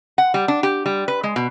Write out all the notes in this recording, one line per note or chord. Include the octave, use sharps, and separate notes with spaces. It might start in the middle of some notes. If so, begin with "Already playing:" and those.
F#5
G3
D4
G4
G3
B4
G#3
B2